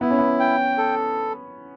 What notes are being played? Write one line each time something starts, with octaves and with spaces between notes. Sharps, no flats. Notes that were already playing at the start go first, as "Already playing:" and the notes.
B3 E4
C#4
B3
G5
A4